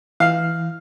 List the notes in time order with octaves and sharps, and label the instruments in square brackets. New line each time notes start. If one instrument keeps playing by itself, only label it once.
[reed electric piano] E3 F6 [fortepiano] F5